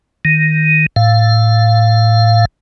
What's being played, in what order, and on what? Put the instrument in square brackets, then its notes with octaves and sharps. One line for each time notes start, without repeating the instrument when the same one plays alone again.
[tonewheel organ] D#3
A2 F5